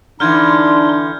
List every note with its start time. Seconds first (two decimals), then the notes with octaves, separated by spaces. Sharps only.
0.20 D3 E3 D4 D#4 C6 F6 G6 G#6